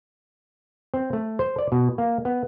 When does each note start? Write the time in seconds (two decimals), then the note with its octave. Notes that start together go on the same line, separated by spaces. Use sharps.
0.94 C4
1.13 A3
1.39 C5
1.59 D5
1.72 B2
1.98 A#3
2.25 B3